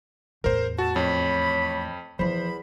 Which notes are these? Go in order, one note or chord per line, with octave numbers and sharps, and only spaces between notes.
E2 A2 A#4 C5
F#4 A5
F2 C#5 B5
E2 E3 F3 C5 B5